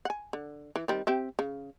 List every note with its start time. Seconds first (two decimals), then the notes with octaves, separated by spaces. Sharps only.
0.05 F#5 G#5
0.33 D3
0.76 E3
0.88 D#3 G3 C4
1.07 C4 G4 E5
1.39 C#3